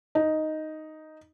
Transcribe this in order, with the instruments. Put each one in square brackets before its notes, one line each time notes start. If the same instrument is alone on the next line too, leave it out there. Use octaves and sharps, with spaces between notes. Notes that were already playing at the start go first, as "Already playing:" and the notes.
[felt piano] D#4